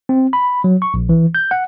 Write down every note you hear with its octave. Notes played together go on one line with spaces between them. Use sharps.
C4
B5
F#3
C#6
A#1
E3
G6
F#5